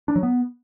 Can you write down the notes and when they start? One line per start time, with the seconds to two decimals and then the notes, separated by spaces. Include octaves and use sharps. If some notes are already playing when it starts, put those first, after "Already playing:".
0.08 D4
0.16 F#3
0.23 B3